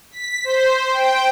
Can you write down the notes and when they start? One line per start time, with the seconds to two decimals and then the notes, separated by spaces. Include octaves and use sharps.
0.11 B6
0.44 C5
0.92 G5